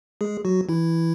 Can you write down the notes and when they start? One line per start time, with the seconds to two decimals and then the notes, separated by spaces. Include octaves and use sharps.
0.21 G#3 G#4
0.45 F#3 F#4
0.69 E3 E4